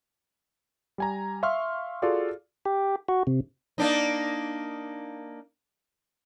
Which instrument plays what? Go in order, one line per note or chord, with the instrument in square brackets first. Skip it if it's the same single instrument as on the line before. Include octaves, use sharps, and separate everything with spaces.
[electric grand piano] G3 G#5 A#5
E5 F5 C6 C#6 F6
F4 F#4 G#4 A4 D5 F5
[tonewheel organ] G4
F#4
C3
[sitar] A#3 D4 D#4